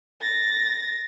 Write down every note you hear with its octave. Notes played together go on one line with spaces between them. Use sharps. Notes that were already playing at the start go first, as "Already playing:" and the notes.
A6 A#6